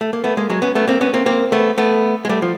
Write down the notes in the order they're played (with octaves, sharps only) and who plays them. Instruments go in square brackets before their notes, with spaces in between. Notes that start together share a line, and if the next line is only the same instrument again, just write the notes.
[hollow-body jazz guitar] A3
A#3
A3 B3
G#3 A#3
F#3 G#3
B3 C#4
A3 B3
A#3 C4
B3 C#4
A#3 C4
A#3 C4
A3 B3
A3 B3
G#3
G3 A3
F3